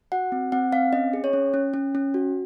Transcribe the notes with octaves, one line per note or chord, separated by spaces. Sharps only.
F#4 F#5
C4
C4 F#5
C4 F5
C#4 D#5
G#4
C#5
C#4
C#4
C#4
C#4
F#4